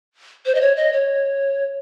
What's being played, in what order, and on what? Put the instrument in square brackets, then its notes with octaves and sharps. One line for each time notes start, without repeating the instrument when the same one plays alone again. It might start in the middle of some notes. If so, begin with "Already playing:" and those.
[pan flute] C5
D#5
C#5
D#5
C#5